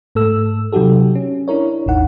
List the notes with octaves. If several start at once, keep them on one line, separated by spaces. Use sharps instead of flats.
G#2 A3 A4 E6
C3 F#3 D#4 F#4 G4 A4
C#4
D4 E4 A#4 C#5
G#1 D#2 D#4 F#5